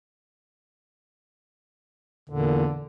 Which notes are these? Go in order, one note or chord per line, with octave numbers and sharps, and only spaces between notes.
E2 A#2 D3